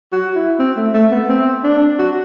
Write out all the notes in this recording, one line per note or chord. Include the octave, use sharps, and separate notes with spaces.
F#4
E4
C4
A3
A3
B3
C4
D4
F#4